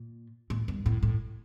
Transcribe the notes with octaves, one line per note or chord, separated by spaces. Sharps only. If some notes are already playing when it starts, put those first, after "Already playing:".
Already playing: A#2
A2
G2
A2
A2